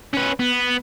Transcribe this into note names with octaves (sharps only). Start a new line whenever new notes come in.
C#4 B4
B3